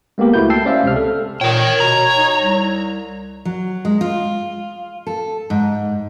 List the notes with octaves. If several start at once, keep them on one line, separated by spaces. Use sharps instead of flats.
G#3 A#3 B3 G4 A#4
C#2 A3 E4 F#4 B4 G6
G5 A5 E6 C7
C#4 C5 D5 E5 F5
C#2 C3 F6
A4
A#2 A#4 C#5 G5
B2 A#5
D#4
C2
F#3
G#3
F4
A4
G#2